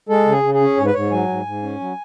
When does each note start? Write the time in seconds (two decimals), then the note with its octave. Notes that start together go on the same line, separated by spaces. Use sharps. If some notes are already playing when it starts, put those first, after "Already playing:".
0.09 G#3 A4
0.26 C#3
0.32 G#4
0.43 C#3
0.54 G#4
0.61 C#4
0.77 G#2 C#5
0.86 B4
0.94 G#2 C#5
1.11 F#3 G#5
1.28 G#2
1.46 G#2
1.63 C#4
1.80 F#3